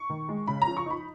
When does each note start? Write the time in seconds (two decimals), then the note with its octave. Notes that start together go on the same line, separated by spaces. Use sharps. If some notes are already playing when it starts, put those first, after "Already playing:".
Already playing: C#6
0.10 D#3
0.29 G#3
0.47 C#3 B5
0.62 A#5
0.67 F3
0.77 C#6
0.86 D#4 B5